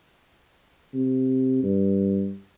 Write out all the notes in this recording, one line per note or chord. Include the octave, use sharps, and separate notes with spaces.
C3
G2